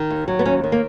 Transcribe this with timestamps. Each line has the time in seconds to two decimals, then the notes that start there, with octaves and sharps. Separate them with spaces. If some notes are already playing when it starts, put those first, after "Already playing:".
Already playing: D#3
0.10 D#2
0.28 F#3
0.39 B3
0.45 D#2 C#4
0.64 D#3
0.72 A#3